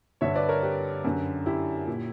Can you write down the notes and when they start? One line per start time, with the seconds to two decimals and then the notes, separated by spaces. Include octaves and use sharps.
0.21 G2 D3 C#5 E5
0.36 B4 D5
0.49 A#4 C#5
0.63 G4 B4
1.04 F#2 D3
1.46 E4 G4
1.87 A#2